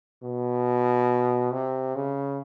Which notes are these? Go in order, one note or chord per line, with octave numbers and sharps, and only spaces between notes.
B2
C3
C#3